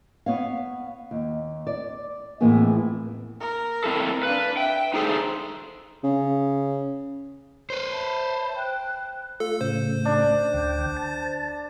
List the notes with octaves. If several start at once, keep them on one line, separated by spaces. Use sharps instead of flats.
B3 C#5 F5
D#2
D5
F2 A2 E3 A#3 B3 G#4
A#4
C4 E4 A4
D4 B4 F5
E5 G5
D#4 G#4 A4 C5
C#3
B4 C5
E5 A5 B5
G5 F#6
A3 F4 A4
A2 C#3 C5
D4
D2 G5
A5